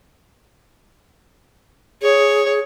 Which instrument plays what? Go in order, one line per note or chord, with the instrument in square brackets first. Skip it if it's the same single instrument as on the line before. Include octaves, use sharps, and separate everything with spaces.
[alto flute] G#4 [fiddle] C#5